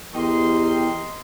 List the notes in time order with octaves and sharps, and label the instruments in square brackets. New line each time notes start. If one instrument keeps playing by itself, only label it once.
[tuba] E2 [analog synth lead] G4 [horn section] A#4 D#5 C6